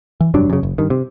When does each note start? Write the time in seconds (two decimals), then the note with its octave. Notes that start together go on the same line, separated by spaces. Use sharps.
0.21 E3
0.34 F1 G2 F#3 D4
0.50 F#2 C#3
0.63 F#1
0.78 G2 D#3
0.90 C3